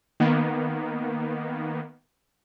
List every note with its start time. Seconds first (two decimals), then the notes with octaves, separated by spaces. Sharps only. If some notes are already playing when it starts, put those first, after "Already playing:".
0.20 D#3 A#3 B3